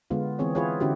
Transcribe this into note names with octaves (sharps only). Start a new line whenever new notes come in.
D3 G#3 B3 F4
E3 B3 C4 G#4 C#5
E4 F4 G#4 B4 C#5
D3 C#4 E4 F#4 G4